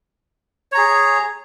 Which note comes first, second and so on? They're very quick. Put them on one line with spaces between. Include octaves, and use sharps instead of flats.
C#5 A#5 G#4